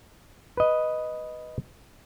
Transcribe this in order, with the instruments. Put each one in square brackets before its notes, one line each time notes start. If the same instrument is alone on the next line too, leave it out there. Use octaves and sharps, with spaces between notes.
[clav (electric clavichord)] B4 D#5